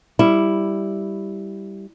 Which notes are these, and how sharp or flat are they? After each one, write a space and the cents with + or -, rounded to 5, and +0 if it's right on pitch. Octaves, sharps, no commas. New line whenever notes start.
G3 +0 E4 +0